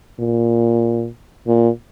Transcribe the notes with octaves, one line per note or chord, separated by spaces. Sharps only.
A#2
A#2